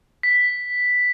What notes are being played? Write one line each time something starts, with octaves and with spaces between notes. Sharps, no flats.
B6